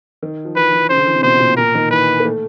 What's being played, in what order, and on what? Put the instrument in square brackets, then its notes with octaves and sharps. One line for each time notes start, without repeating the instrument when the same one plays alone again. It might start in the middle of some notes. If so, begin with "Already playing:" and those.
[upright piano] D#3
F3
[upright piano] E3 [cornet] B4
[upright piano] E3
[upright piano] C#3 [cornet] C5
[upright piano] D3
E3
C3
[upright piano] B2 [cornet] C5
[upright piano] A#2
[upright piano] A#2 [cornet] A#4
[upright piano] D#3
[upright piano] E3 [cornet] B4
[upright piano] A#3
A3